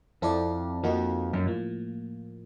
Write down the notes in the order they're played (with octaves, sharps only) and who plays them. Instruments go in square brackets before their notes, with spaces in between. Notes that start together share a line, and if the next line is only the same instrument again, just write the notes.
[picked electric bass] F2 [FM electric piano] C4 E4 A4 D5
[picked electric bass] F2 [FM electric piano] F3 A#3 D#4 F#4
[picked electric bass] F#2
[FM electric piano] A2 F3 A#3